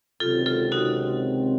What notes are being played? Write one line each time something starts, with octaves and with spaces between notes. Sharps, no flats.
C#2 C3 D#3 F#3 C4 F4 A4
F4 A4
D#4 F#4